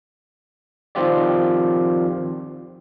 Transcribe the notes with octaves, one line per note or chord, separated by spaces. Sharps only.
D#3 F3 C4 F4 G4 D5